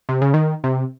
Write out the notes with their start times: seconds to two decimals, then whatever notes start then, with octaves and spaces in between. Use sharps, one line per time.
0.09 C3
0.22 C#3
0.34 D#3
0.64 C3